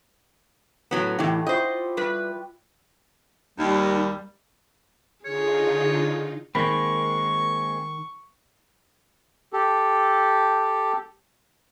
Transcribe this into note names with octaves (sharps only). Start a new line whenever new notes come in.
A2 F#3 B3
A2 E3 D#4 G4 F#5
E4 F4 C5 D#5 C#6
G3 B4
D#2 G3 D#4
D3 D#4 F4 G#4 C#5
D#3 G#3 A#3 C4 A#4 B5 C#6 B6
G4 A4